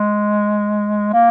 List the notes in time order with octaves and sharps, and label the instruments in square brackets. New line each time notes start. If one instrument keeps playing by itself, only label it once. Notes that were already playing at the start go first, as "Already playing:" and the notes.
Already playing: [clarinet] G#3
A#3